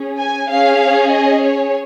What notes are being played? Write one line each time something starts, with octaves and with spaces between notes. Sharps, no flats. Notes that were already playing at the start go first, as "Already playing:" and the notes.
Already playing: C#4 G#4
G#5
C#4 G#4 F5
D#5
C#5